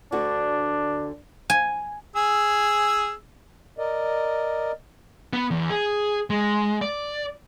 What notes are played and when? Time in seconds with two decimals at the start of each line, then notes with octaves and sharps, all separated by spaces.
0.12 D2 D3 D4 F#4
1.50 G#5
2.16 G#4 G#5 E6
3.78 A#4 D5 D#5
5.33 B3
5.51 E2
5.70 G#4
6.30 G#3
6.82 D5